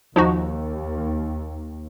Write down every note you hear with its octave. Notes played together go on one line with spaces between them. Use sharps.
D#2 F3 D#4 F#4